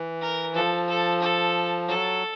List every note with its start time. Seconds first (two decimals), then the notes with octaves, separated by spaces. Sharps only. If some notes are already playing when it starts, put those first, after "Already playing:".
Already playing: E3
0.22 A#4
0.55 F3 A4
0.89 A4
1.21 A4
1.88 F#3 A4